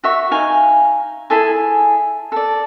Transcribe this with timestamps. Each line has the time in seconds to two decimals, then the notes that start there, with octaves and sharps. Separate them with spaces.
0.04 F#4 E5 C#6
0.31 D#4 F5 G#5
1.30 E4 G#4 A4 G#5
2.32 A4 D5